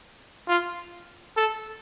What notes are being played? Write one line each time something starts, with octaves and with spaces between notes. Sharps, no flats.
F4
A4